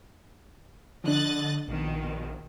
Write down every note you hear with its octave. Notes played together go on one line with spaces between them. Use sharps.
D3 F3 D4 D#5 F#6 A6
A#1 B2 D#3